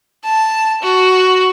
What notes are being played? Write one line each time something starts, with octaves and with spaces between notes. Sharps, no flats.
A5
F#4